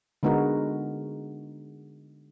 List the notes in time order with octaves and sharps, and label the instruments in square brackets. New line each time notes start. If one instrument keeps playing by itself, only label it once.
[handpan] D3 G#3 B3 D#4 F#4 A#4